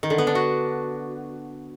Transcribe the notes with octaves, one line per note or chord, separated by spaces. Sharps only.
D#3
D3
B3
D4
F#4